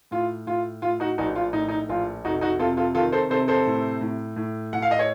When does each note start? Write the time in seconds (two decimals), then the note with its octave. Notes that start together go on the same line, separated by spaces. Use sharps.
0.11 A2 F4
0.46 A2 F4
0.82 A2 F4
1.00 D#4 F#4
1.18 A#1 D#4 F#4
1.35 F4
1.53 A2 D#4
1.68 D#4
1.89 A#1 F4
2.25 F1 D#4 F#4
2.41 D#4 F#4
2.59 C3 F4 A4
2.77 F4 A4
2.95 D#3 F4 A4
3.12 A4 C5
3.30 C3 A4 C5
3.48 A4 C5
3.66 A2
4.01 A2
4.36 A2
4.73 A2 F#5
4.82 F5
4.91 D#5
4.99 C#5